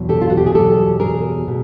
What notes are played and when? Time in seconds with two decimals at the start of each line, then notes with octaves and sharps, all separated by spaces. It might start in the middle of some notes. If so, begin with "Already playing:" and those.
Already playing: E2 B2 F#3
0.09 G4 A4
0.21 F4
0.30 F#4
0.37 G4
0.46 G#4
0.54 E2 B2 F#3 G4 A4
1.00 G#4 A#4
1.48 B2